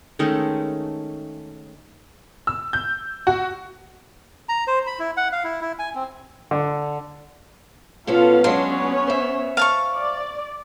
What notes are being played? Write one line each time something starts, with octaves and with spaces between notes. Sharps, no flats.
D#3 G#3 A3 C#4
E6
G6
F#4
A#5
C5
B5
E4
F#5
F5
E4
E4
G#5
C4
D3
B2 B3 C#4 F4 A4 F5
F#3 G#3 B3 C#4 D4 C#5 C6
C5 E5
F5 A5 C#6
D5